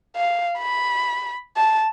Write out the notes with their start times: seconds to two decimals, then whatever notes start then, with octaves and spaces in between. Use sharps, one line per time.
0.16 F5
0.59 B5
1.57 A5